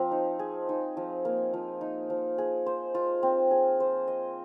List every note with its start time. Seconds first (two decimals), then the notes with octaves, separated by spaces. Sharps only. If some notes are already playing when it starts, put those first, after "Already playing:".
Already playing: F3 C4
0.11 D#4
0.39 G#4
0.69 D#4
0.97 F3
1.25 A#3
1.54 F3
1.81 D#4
2.10 F3
2.38 G#4
2.66 C5
2.95 F4
3.23 C4
3.51 G#4
3.80 C5
4.08 D#5